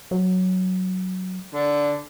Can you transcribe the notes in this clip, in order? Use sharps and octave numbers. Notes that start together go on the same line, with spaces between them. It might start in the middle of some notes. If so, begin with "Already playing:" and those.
F#3
D3